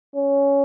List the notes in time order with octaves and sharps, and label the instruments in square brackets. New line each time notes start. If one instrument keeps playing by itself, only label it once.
[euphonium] C#4